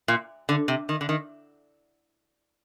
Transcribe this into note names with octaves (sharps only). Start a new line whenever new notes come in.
A#2
D3
C3
D#3
D3
D#3